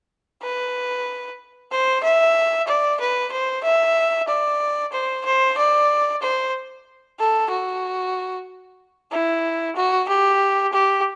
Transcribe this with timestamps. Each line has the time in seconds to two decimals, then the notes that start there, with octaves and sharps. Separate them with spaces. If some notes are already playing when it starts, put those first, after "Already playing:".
0.42 B4
1.71 C5
2.04 E5
2.67 D5
3.00 B4
3.32 C5
3.64 E5
4.28 D5
4.92 C5
5.25 C5
5.58 D5
6.22 C5
7.19 A4
7.50 F#4
9.11 E4
9.76 F#4
10.08 G4
10.72 G4